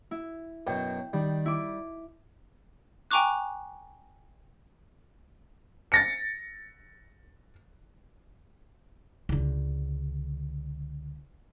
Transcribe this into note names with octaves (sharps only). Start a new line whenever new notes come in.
E4
F#2 B2 F#3 G5
D#3 G3
E4 D6
G5 G#5 A#5 C#6 D6 F#6
A6 A#6 C#7
C#2 D3